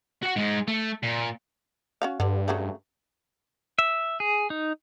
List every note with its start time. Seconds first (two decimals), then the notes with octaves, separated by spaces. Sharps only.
0.23 F#4 F#5
0.36 G#2 G#3
0.68 A3
1.03 A#2
2.02 C#4 F#4 F5
2.20 G2 D3
2.48 C#3 F#3 A3
3.79 E5
4.20 G#4
4.50 D#4